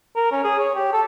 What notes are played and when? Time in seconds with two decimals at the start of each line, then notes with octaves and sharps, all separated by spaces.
0.16 A#4
0.32 C#4
0.44 G#4
0.59 C#5
0.75 G4
0.93 A4